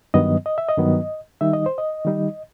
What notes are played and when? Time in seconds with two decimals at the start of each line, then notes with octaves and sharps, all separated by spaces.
0.14 G2 D#3 F#3 B3 D#5
0.46 D#5
0.58 E5
0.69 D#5
0.78 G2 D#3 F#3 B3
1.41 D#3 G3 D#4 E5
1.53 D#5
1.66 C5
1.78 D#5
2.05 D#3 G3 D#4